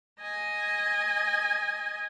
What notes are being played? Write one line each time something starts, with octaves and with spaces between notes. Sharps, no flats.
D#5 G#5